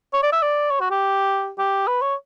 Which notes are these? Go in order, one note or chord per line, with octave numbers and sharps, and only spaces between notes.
C#5
D5
E5
D5
C#5
F#4
G4
G4
B4
C#5